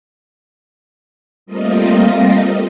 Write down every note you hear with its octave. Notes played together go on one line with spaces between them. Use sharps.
G3 A3 A#3 C4 F4 D#5